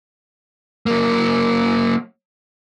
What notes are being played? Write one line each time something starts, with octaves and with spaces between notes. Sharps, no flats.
F#3 A#3